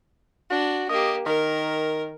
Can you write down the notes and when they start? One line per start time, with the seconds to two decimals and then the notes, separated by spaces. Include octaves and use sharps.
0.50 D4 F#4
0.89 A#3 G4 D#5
1.26 D#3 A#4